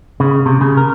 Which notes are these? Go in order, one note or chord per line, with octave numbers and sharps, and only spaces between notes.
C#3
C3
C#3
A#4